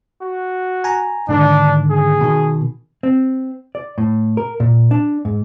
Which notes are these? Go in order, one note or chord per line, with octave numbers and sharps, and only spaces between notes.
F#4
G#5 A#5
G#2 D3 D#3 D4
G#4
B2 D#3
C4
D5
A2
A#4
A#2
D4
G#2